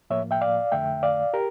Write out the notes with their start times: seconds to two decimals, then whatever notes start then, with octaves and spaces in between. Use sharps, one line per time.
0.10 A2 F3 A#3 C#5 E5
0.31 E5 G5
0.41 D5 F5
0.72 F2 D3 A3 E5 G5
1.03 D5 F5
1.33 G4 A#4